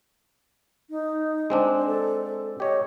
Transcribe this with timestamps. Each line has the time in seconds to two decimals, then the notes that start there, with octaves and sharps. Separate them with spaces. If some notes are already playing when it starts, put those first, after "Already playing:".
0.90 D#4
1.50 G#3 C4 D4
1.75 C5
1.87 A4
2.60 G4 C#5 D#5